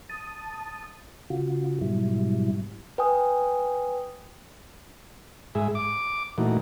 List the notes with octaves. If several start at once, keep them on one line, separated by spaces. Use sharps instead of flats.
A5 D#6
C#3 F4 F#4
G#2 B2 F#3 G3 E4
B4 G5 G#5 D#6
G#2 G#4 E5
D6
A#2 E3 A3 D#4 F#4